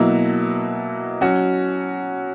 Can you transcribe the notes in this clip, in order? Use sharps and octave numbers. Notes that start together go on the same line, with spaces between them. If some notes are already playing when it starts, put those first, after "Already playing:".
Already playing: B2 F#3 A#3 E4
F#3 C#4 F#4